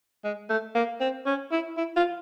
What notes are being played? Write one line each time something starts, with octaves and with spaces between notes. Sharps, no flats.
G#3
A3
A#3
C4
C#4
E4
E4
F4